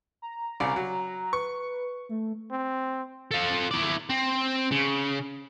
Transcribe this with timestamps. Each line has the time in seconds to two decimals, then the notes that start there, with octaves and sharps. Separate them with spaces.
0.22 A#5
0.60 C2 C#3 D5
0.76 F#3
1.33 B4 C#6
2.09 A3
2.51 C4
3.31 F4 A4
3.71 E4 D5
4.10 C4
4.72 C#3